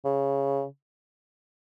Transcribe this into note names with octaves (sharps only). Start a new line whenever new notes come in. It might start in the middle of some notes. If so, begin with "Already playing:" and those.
C#3